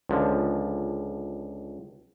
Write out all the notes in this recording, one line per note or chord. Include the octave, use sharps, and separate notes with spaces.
C#2 D3 F3